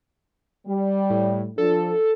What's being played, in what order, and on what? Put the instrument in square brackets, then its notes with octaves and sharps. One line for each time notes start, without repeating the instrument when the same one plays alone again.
[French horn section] G3
[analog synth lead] A2
[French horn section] F3 D4 [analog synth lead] A4